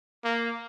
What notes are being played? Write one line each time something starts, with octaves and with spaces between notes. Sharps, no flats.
A#3